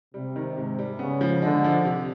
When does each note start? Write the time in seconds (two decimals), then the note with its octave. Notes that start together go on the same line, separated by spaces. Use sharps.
0.14 C3 G3
0.36 D#3
0.57 G#2 C3
0.79 G3
0.99 C#3 B3
1.21 F3
1.42 D3 G#3
1.64 F3
1.85 C3